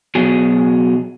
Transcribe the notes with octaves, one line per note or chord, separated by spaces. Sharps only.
B2 F#3 G#4